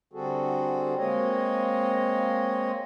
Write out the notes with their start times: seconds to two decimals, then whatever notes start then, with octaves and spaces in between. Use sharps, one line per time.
0.13 D3 G3 C4 F#4 G#4 A4
0.97 G#3 A#3 C4 C#5 D#5